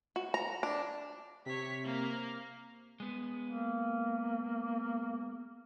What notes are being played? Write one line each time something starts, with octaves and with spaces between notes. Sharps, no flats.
F#4
A#5
D4
C3 C#5 B6
A#3 F5
G#3 B3
A#3